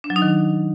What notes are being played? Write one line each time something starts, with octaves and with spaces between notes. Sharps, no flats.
D4
F#3
D#4
D#3